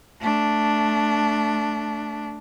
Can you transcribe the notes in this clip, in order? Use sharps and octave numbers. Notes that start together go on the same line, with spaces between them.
A3 D4